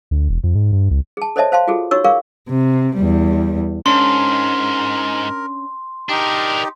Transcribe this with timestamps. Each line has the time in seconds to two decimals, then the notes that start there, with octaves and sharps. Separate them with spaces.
0.11 D2
0.29 E1
0.44 F2
0.55 G#2
0.73 G2
0.91 C#2
1.17 G#4 A5
1.36 A4 C5 C#5 D#5 E5 A5
1.52 C5 F5 A5 C6
1.68 F4 F#4 G#4 A4
1.91 D#4 F#4 C#5 C#6 E6
2.04 G#4 A#4 D5 F5 C#6
2.49 C3
2.96 E2 G3
3.86 G#2 C#4 D4 A#4 C6
6.09 D4 D#4 G4 A#4